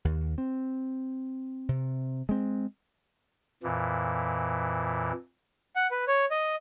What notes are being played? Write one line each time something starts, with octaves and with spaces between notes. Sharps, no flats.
D#2
C4
C3
G#3 C4
F2 A#2 E3
F#5
B4
C#5
D#5